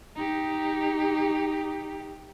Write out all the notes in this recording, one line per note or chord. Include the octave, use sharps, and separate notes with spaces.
D#4 G4